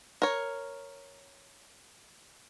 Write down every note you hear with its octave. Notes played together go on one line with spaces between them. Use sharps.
A#4 C#5